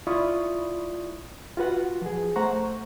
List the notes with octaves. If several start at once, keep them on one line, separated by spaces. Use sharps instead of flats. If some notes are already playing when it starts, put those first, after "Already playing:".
E4 F4 D5 B5 C#6 D#6
F4 F#4 B4 F#5
F3 G#4
A3 C5 F#5 A#5 C#6